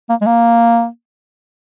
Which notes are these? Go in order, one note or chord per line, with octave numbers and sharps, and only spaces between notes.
A#3
G#3
A#3